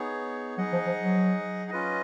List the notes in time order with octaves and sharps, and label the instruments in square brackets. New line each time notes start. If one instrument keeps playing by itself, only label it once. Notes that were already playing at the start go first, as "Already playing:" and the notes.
Already playing: [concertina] B3 D#4 G#4 C#5
[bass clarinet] F#3 [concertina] D#4 G#4 D#5 F#5
[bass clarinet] F3
F3
F#3
[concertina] C#4 F4 B4 D#5